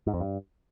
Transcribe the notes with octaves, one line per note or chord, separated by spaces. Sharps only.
G#2
F2
G2